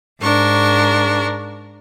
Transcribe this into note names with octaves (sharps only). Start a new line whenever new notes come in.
G#2 D4 A#4 C#6